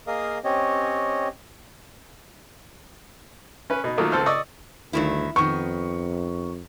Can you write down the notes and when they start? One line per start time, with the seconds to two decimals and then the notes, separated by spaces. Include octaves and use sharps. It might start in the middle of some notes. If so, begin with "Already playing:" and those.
0.07 A#3 G#4 A#4 D#5 F5 D#6
0.44 C4 C#4 G4 C#5 D#5
3.70 C#4 B4
3.84 B2 D#4
3.97 D#3 F3 F#3 A3 A#3
4.12 C#2 C4 A4 C5 F6
4.26 D5 D#5 C#6 D#6 E6
4.93 D2 G2 D#3 E4
5.36 F2 D#3 B3 C#6